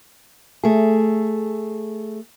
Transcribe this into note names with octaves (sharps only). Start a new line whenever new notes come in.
A3 G#4